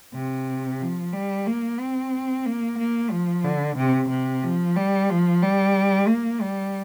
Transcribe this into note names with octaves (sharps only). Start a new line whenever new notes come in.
C3
F3
G3
A#3
C4
A#3
A#3
F3
D3
C3
C3
F3
G3
F3
G3
A#3
G3